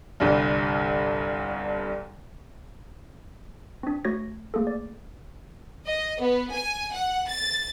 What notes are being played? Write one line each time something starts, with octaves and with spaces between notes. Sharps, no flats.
G1 C2 G2
C4 D4
A3 F#4 C#5 G#6 A#6
A3 A#3 G#4 A4
D5
D#5
B3
G#5
F#5
A6